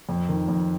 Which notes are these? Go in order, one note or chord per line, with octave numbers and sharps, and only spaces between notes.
F2
D#3
F2